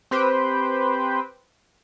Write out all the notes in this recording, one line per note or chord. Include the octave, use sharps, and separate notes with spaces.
C4 G4 B4 C5 G5